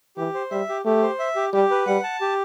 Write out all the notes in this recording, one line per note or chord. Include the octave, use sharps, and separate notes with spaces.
E3 G4
C5
G3 E5
G4
A3 G4
C5
E5
G4
G3 G4
B4
G3 F#5
A5
G4